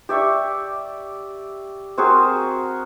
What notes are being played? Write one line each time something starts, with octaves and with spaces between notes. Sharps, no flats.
G4 D5 E5 C#6
C4 F#4 G#4 A#4